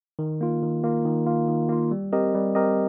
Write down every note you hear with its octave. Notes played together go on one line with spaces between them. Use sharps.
D#3
A#3 F4
D#3
A#3 F4
D#3
A#3 F4
D#3
A#3 F4
G3
C4 G4 A#4 D#5
G3
C4 G4 A#4 D#5